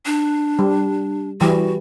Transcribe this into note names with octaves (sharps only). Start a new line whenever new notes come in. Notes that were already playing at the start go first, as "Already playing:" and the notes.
D4
G3
E3 G3 F#4